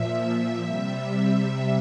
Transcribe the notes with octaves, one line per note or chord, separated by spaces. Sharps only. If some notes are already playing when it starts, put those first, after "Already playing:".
Already playing: A#2 F3 E5
E5
C3 G3 E5